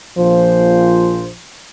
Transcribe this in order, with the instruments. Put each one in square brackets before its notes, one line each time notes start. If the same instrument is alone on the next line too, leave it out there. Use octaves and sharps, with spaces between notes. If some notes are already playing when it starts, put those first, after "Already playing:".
[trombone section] A#1 A#2 C5 [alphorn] F3